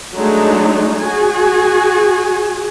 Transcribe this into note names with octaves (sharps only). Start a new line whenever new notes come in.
F#3 G#3 A3 D4 D#4
F#4 G#4 G#5